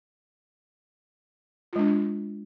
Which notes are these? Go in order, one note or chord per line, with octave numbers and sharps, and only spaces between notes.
G#3 D4 F4